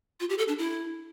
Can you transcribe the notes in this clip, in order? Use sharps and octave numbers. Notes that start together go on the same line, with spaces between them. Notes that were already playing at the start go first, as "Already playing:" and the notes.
F4
G4
A4
D4
E4